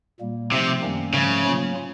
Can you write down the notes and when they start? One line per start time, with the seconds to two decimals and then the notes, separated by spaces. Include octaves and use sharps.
0.20 A#2 G3 A#3
0.51 C3 F3 A3 C4 D#4
0.82 F#2 D#3 G3 A#3 C#4
1.12 G#2 C#3 F3 A3
1.43 F#3 A#3 C#4 F4